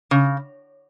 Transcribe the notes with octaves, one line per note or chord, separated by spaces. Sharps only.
C#3